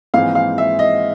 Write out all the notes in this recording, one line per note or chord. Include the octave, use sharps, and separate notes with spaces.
A#1 G#2 E3 G#3 C4 F5
F5
E5
D#5